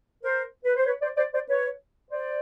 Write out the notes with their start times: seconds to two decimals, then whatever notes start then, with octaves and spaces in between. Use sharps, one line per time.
0.24 A#4 C5
0.65 B4
0.75 C5
0.86 B4 C#5
1.01 C5 D5
1.17 C5 D5
1.33 C5 D5
1.48 B4 C#5
2.11 C5 D5